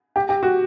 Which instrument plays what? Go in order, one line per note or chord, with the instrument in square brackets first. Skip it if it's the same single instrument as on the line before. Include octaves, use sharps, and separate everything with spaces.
[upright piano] G4
G4
F#4